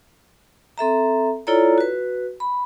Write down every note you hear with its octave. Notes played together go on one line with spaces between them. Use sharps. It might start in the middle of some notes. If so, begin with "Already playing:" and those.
C4 A4 E5 A#5
E4 F4 A4 C#5 D5 A#5
F#4 B4
B5